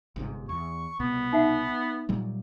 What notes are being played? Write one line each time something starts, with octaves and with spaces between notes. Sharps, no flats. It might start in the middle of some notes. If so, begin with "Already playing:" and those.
G1 G#2 C3
E2 C#6
C2 B2 B3
D#4 E5 F#5
A#2 F#3 G3